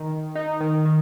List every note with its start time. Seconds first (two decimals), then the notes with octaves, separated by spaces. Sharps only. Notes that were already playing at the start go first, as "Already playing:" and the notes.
Already playing: D#3
0.11 D#3
0.35 D#4
0.61 D#3
0.86 D#3